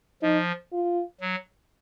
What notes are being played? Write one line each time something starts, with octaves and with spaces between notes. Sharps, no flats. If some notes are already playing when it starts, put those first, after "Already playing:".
F3 D#4
F4
F#3